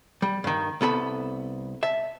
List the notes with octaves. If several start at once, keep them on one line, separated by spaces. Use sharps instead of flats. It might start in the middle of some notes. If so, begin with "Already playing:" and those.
G3
G2 D#3
C2 B3 A4 B5
E5 A5